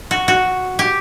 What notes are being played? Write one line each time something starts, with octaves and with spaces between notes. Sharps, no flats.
F#4
F#4
G4